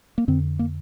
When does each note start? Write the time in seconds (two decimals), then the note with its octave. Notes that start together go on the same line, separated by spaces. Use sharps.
0.18 A#3
0.27 F2 D3 C4
0.59 A#3